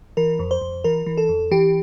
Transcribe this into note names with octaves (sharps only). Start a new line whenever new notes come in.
E3 A#4
F2
C5
F2
E3 A#4
E3
A4
F2
E3 G4